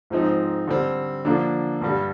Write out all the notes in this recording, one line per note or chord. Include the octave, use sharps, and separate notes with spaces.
G#2 F3 C4 D#4
D3 G3 C4
D3 F3 A#3 D4
G2 D3 G3